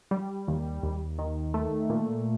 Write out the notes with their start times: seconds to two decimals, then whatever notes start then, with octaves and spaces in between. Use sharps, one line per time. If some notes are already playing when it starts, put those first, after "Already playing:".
0.11 G3
0.48 D#2
0.83 D#2
1.19 D#3
1.54 A3
1.90 A#2